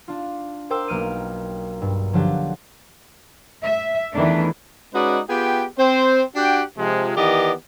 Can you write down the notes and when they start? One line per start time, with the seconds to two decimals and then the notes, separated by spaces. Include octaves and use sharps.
0.08 D4 F4
0.70 A#4 C5 G5 D6 E6
0.88 B1 A#3 F6 D7 D#7
1.82 G2
2.13 D3 F3 F#3 D4 G4
3.62 E5
4.15 E2 D#3 E3 A3 D4
4.94 G#3 C#4 D#4 F#4 B4 D5
5.30 B3 F4 G4 G#4 G5
5.79 C4 C5
6.36 D4 F#4 G4 F#5 G5
6.78 C3 F3 G#3
7.17 D#3 E3 B3 G4 D5 D#5